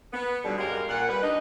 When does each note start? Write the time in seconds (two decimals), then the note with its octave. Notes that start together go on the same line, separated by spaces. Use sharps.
0.12 B3
0.44 G#2 B2 D3 F#3 G3
0.58 F#2 G#3 G4 A#4 D5 F5
0.89 A#2 F#5
1.08 G3 B4
1.22 D4 D#4 D#5